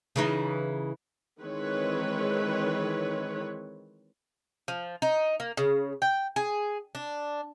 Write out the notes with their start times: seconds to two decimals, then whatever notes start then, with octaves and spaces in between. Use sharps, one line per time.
0.16 C#3 E3 D#4
1.39 D#3 E3 G#3 C4 B4 C#5
4.68 F3
5.02 D#4
5.40 A#3
5.57 C#3
6.02 G5
6.36 G#4
6.95 D4